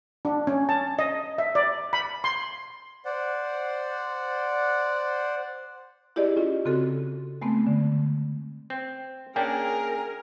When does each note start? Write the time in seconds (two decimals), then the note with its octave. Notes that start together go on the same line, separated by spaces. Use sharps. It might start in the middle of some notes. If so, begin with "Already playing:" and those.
0.25 D4
0.47 C#4
0.69 A5
0.99 D#5
1.38 E5
1.55 D5
1.93 B5
2.24 C6
3.05 C5 D5 F#5
6.16 E4 G4 G#4 D5 D#5
6.37 C#4 F4 D#5
6.65 C#3 C4 F#4 A4
7.42 G#3 A3 B3 C4
7.67 D3
8.70 C4
9.36 A#3 C#4 D4 G#4 A#4 G5